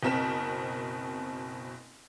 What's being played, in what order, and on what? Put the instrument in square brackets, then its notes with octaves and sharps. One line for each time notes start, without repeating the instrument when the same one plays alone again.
[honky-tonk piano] F#1 B2 C4 A#4 B6 E7